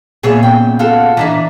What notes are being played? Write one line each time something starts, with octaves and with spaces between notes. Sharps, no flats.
A#2 C#3 B3 G#4 C#5 E5
G5
F4 F#4 A4
E3 D4 E5 A#5